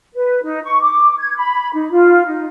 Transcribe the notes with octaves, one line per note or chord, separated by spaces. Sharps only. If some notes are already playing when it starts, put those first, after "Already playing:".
B4
D#4
C#6
D6
G#6
B5
D#4
F4
D#4